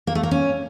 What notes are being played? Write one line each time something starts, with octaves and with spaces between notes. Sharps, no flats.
A#3
A3
A#3
C#4